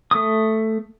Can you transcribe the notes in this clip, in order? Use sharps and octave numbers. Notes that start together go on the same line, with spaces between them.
A3 D#6